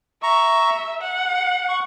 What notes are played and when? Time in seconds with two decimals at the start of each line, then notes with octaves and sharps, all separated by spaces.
0.23 E5 A#5 C#6
1.01 F#5
1.69 C#6